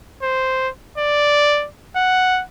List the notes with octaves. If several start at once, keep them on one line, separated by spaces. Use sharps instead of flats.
C5
D5
F#5